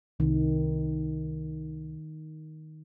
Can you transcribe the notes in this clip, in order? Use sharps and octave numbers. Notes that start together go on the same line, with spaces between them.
C2 D#3